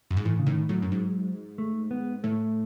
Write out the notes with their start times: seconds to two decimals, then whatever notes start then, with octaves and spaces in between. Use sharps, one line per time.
0.10 F#2
0.17 G#2
0.25 A2 E3
0.39 C#3
0.46 A2 D#3
0.69 A2 F#3
0.82 F#2
0.92 G#2
1.58 A3
1.91 B3
2.24 A2 A3